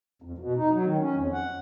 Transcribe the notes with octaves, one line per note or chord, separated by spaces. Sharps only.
F2
B2
D#4
F#3
D#3
C#4
F2
F#5